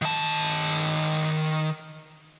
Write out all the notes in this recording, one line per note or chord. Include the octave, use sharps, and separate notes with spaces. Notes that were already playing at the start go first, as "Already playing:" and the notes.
D#3 A5